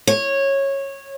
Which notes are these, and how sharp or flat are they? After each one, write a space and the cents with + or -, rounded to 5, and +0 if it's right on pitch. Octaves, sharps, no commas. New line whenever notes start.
C#5 -15